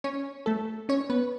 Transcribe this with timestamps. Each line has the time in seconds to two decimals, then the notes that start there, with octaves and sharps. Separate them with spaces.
0.04 C#4 C#5
0.46 A3 A4
0.89 C#4 C#5
1.10 B3 B4